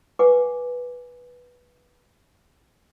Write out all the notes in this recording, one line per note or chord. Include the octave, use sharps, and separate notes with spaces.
B4 F#5 G#5 D6